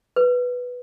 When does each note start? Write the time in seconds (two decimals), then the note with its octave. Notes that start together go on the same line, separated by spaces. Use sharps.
0.16 B4